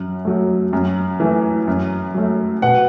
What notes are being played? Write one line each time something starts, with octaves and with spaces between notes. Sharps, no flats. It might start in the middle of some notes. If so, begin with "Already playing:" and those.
Already playing: F#2
F#3 A3
F#2
E3 A3
F#2
F#3 A3
B2 F#5